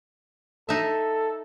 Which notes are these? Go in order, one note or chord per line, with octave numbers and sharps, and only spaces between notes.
D#4 A4 E5